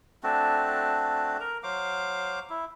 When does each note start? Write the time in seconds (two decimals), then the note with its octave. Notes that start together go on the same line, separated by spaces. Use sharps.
0.24 A3 C4 D4 F#4
1.40 A#4 A#5
1.63 F#3 C5 F5 D6
2.50 E4